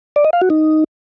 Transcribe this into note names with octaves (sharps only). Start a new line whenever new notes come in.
D5
D#5
F5
F#4
D#4